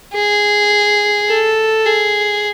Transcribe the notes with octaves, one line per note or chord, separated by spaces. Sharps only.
G#4
A4
G#4